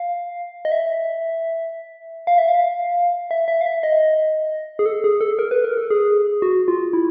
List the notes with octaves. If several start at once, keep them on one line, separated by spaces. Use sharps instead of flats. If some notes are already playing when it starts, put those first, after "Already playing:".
Already playing: F5
D#5
E5
F5
E5
F5
E5
E5
F5
E5
D#5
G#4
A4
G#4
A4
A#4
B4
A#4
A4
G#4
F#4
F4
E4